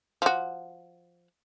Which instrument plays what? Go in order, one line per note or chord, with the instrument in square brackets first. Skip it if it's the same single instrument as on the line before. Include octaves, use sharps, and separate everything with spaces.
[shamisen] F3 F#4